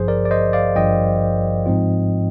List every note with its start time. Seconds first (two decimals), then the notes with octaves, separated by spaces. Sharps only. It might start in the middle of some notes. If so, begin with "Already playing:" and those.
Already playing: G#1 G2 F3 G#4 C5
0.08 A#4 D5
0.25 D5
0.31 C5 D#5
0.53 D5 F5
0.76 G#1 G2 F3 D#5 G5
1.66 G#2 F3 C4 F4